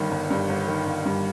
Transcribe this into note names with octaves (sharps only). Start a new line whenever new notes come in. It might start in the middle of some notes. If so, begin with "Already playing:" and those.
Already playing: G1 G2 D#3
G1
G2
G1
D#3
G1
G2